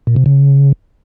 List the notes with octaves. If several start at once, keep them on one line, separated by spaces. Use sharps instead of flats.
A#2
C3
C#3